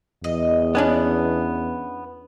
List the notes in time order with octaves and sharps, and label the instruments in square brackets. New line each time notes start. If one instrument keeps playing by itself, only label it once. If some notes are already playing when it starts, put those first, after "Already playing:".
[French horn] E2 [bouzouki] D#5
[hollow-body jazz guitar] B3 C#4 D4